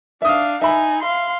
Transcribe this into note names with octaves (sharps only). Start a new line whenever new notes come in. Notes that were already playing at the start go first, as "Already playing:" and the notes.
D4 E5 F5 D#6
D#4 E5 G#5 B5
F5 C6